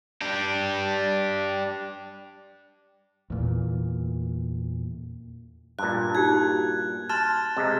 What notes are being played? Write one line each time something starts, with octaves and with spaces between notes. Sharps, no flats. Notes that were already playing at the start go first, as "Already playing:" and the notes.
D4 G4
E2 A#2
G2 A#2 F#6
D#4 F#4 G4 G#6
A5 C6 F6 A6 E7
C3 G#3